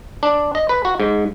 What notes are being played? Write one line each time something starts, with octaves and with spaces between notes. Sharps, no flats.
D4
D#5
B4
F#4
G#2